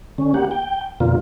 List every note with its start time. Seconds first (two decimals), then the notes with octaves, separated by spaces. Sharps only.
0.18 D3 C#4
0.34 A#3 G4 F#5
0.51 G5
1.00 F2 B2 D3 A#3 F4